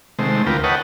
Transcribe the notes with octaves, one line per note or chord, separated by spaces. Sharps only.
C3 D#3 G#3 A3 C5
D2 F4 A#4 B4 G5
B4 C#5 D#5 F#5 G5 A5